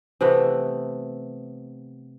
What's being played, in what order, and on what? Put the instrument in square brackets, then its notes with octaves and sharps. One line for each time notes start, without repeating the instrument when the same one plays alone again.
[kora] C3 E3 A3 B3